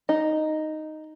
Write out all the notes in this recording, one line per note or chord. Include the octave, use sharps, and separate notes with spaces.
D#4